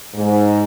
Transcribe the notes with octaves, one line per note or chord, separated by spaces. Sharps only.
G#2